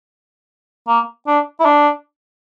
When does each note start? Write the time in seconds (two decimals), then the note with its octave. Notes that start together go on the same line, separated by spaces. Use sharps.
0.88 A#3
1.27 D4
1.60 E4
1.65 D4